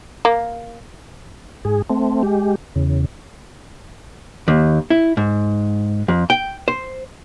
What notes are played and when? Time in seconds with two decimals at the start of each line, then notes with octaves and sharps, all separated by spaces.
0.25 A#3
1.65 G#2 G#4
1.90 A3 C4
2.23 G#3 G4
2.76 E2 C#3
4.48 D#2
4.90 E4
5.17 G#2
6.08 F2
6.30 G5
6.68 C5